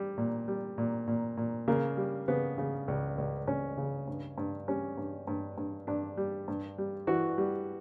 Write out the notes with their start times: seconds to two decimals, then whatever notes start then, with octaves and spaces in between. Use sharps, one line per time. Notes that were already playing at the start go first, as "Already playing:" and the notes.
Already playing: G3
0.18 A#2
0.48 G3
0.78 A#2
1.07 A#2
1.37 A#2
1.68 C#3 A#3
1.97 G3
2.28 C#3 B3
2.58 C#3
2.88 C#2
3.18 C#2
3.47 C#2 C#4
3.77 C#3
4.08 G2
4.38 G2
4.68 G3 C#4
4.98 G2
5.27 G2
5.57 G2
5.87 G2 D4
6.17 G3
6.48 G2
6.78 G3
7.07 E3 F#4
7.38 G3